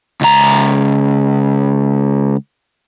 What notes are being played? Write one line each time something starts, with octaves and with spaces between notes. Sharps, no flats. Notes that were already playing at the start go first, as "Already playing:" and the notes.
C#2 A#5